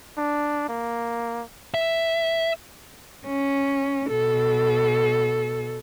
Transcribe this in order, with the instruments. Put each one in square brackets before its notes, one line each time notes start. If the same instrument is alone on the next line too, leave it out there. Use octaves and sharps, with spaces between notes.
[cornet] D4
A#3
[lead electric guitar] E5
[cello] C#4
B2 A4